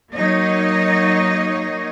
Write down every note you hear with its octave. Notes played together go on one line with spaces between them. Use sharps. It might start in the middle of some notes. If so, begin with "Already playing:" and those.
F#3 A#3 D#4 C#5 D#5